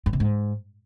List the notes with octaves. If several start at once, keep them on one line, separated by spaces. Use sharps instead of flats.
G2
C3
G#2